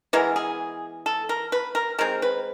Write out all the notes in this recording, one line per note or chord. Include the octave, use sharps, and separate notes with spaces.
E3 G#3 B3 A#4
G#4
A4
A#4
B4
A#4
D#3 G#3 C4 A#4
B4